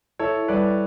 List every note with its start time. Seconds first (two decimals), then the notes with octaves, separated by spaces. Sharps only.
0.19 E4 A4 C#5
0.48 G3 B4 D5